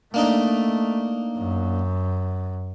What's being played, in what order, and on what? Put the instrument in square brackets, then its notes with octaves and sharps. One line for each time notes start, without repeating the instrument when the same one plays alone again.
[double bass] A3 [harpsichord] A#3 D4 D#4
[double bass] F#2